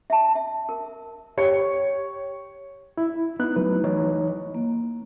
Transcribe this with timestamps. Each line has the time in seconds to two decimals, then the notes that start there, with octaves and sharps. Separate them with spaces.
0.10 E5 A5
0.35 E5
0.69 A#4
1.37 G4 C#5 C#7
2.98 E4
3.39 B3 D#4 E4 F#6
3.56 F#3 A3 B4
3.84 E3 D#4 C#5
4.55 A#3